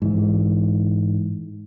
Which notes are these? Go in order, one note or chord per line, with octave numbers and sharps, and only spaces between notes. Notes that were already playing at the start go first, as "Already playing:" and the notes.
G#2 E3